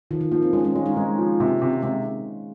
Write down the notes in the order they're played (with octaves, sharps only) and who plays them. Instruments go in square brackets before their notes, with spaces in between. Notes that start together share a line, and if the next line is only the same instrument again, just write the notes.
[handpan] D#3 [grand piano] F3
[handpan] D#3
[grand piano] F3 [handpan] A#3
[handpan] C4
[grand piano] G#3 [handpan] C#4
[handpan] C4
C#4
[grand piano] G#3 [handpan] F4
[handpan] D#4
[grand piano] G#3 [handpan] C4
[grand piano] F3
[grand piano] C3 [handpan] A#3
[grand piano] C3
[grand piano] C3 [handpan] G#3